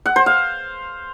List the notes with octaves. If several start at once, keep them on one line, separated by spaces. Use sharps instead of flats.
F#5
C5
F5